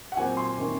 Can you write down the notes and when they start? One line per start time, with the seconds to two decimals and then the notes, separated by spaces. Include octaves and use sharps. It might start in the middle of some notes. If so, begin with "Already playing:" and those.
0.12 F#5
0.17 A#2 F#3 C4 G#5
0.37 C6
0.58 C3 D#3 A#3 C#4